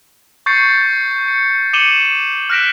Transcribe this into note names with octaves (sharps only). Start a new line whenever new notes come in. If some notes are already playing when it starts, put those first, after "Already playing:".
C#6 G6 A6 C7 C#7
C#7
D6 C#7 D#7 E7 F#7 G7
F6 F#6 A#6 B6 D7 E7